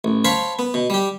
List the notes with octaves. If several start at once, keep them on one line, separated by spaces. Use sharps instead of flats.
A1
C5 C#5 F5 A5 B5 C#6
B3
B2
G3 G4